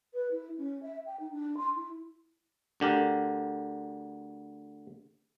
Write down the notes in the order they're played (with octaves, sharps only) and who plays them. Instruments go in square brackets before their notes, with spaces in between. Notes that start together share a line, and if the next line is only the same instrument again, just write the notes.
[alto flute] B4
E4
C#4
E5
G5
D#4
D4
C6
E4
[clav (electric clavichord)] D2 D3 G4 A#4